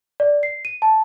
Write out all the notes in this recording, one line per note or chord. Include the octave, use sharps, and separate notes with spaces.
D5
C7
D#7
A5